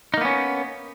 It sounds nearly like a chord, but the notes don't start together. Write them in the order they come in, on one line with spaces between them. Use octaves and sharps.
D#4 A#3 B3 C#4